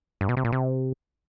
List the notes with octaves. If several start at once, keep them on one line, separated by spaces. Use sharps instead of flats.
G2
B2
C3
A#2
C3